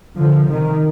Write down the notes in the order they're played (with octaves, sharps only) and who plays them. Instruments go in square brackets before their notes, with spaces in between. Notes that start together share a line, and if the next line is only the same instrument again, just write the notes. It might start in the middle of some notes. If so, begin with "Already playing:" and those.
[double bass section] D3 F3
C3 D#3